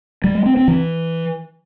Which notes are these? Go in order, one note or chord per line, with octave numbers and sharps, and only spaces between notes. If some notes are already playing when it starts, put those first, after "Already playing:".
G3
G#3
C4
C4
E3